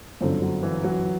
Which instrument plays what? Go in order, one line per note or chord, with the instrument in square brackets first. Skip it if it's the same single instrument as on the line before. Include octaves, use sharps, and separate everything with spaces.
[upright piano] G1 F#2 D3 [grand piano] C4
[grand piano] F#3
E3
F#3